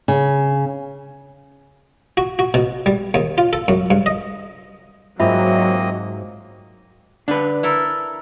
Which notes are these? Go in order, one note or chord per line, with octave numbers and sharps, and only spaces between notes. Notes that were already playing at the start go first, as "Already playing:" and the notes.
C#3
F#4
F#4
B2
G3
D#2
F4
A4
F#2
G2
D#5
G#2 F#3 A#3 C4 F4 D#5 E5
D3 D4 B4
E4 A4 A#4